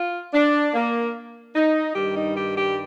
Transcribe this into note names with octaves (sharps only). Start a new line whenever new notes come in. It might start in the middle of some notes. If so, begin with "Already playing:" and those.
Already playing: F4
D4
A#3
D#4
G2 D#3 G3 G4
D#4
G4
G4